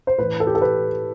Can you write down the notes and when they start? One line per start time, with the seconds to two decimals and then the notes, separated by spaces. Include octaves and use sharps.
0.07 C5
0.18 A2 E3 B4
0.40 A4
0.47 G4
0.55 A4
0.61 B4